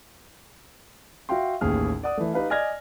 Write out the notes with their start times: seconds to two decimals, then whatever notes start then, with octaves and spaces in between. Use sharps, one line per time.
1.29 F#4 E5 F5 G5 C6
1.61 A1 D#2 G#4 F6
2.03 D5 F#5 D#6
2.17 E3 A3
2.34 D#4 G4 B4 D#5 F5
2.50 D5 D#5 G#5 F6 G#6 A#6